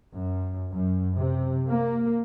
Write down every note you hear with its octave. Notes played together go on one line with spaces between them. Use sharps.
F#2
F#2
C3
A#3